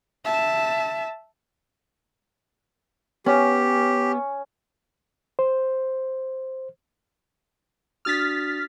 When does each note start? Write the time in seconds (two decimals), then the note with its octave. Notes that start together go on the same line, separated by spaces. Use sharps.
0.25 E5 A5
3.26 B3 C#4 G4
5.39 C5
8.05 D4 F#4 D#6 F6 A6 B6